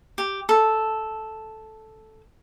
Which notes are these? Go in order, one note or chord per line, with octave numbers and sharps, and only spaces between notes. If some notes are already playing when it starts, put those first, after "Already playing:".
G4
A4